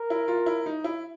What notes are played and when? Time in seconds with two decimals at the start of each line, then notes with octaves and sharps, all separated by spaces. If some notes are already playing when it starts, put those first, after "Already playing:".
Already playing: A#4
0.10 E4
0.28 F4
0.46 E4
0.66 D#4
0.84 E4